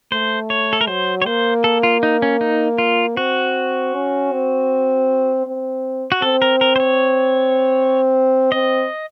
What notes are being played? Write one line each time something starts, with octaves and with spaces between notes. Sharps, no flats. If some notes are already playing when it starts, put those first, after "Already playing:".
A3 C5
C#5
A4
A#4
F#3 C5
C#5
A#3 C5
A4
F4
D#4
C#4
D#4
F4
C4 F#4
C#4
C4
C4
F#4
C4 A4
A#4
A#4
C5
C#5
C4 D#5